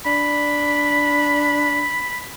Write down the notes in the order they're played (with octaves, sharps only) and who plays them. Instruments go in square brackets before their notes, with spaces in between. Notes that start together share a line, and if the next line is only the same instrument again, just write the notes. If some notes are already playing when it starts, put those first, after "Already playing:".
[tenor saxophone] D4 [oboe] B5